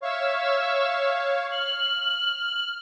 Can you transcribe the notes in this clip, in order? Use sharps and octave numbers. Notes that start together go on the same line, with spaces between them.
C#5 E5 F5 C#6
F6 F#7